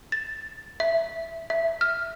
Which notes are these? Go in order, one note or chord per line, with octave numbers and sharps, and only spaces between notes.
A6
E5
E5
F6